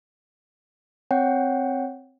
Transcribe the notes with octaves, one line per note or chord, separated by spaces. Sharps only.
C4 C#5 F#5 G5